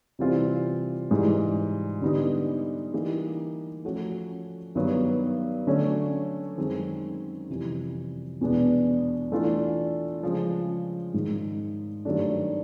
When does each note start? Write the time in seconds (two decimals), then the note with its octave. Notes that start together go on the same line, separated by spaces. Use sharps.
0.19 C3 E3 G3 C4 F4
1.11 G#2 E3 G3
2.01 D3 G3 B3 D#4
2.93 E3 G3 A#3 D#4 G4
3.84 F3 A3 C#4 F#4
4.75 G2 D#3 F#3 B3
5.67 D3 F#3 A3 C#4
6.58 F#2 D#3 G#3 C4
7.50 F2 C3 E3 G3
8.41 E2 B2 G#3 B3 D4
9.32 E3 A3 D4 F4
10.23 C#3 F3 G#3
11.14 G#2 D#3 G#3
12.05 G2 D#3 F#3 A3 D4